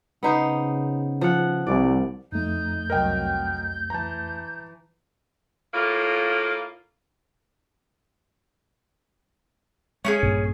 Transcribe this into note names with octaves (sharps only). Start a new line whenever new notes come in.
C#3 B3 D#4 C5
F3 F#5
C2 G3 D5
F2 F3 A3 D#4 G6
C2 F#3 A#4 D#5 G5
E3 A5 A#5
A2 A#3 F4
G#3 C#4 D#4 G#4
A#1 G2 A#2